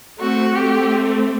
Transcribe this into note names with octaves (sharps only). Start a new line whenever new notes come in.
A3 C4 F#4
A3 C4 G4